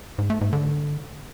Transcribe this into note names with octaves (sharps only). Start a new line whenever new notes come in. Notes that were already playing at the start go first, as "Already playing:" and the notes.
G#2
A3
G#2
D3